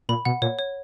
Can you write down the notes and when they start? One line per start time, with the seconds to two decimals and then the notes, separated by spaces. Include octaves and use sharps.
0.09 A#2 B5
0.25 B2 F#5
0.42 A#2 C#5
0.59 C#5